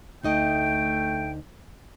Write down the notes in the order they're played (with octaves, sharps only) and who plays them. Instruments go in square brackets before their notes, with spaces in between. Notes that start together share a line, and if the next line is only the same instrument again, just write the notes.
[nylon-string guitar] D2 D#4 D#5 [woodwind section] A3 G5